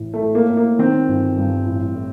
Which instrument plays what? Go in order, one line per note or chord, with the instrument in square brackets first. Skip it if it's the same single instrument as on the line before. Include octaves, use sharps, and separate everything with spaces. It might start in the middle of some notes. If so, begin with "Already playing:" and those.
Already playing: [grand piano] A1
A3
A2
A#3
A2
A#3
D#3 C4
G1
G2
A1
A2